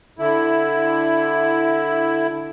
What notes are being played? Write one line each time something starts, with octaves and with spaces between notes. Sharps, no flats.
D3 E4